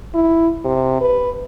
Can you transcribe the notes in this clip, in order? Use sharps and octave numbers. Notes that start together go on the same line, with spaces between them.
E4
C3
B4